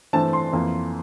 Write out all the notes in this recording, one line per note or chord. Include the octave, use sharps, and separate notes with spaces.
G2 E3 A3 C4 A5
C6
F2 E3 A#3